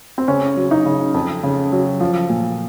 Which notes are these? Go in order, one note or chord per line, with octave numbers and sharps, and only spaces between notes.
C4
C#3 C#4
F#3
D#4
C#3
F2
C#3
F#3
F3
A#2